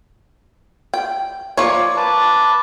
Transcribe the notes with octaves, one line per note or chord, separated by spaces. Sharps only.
G5
F3 A#3 C#5 D5
B4 A5 D6